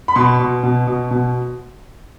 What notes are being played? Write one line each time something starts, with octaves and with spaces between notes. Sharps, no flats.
B5
B2 C6
B2
B2
B2
B2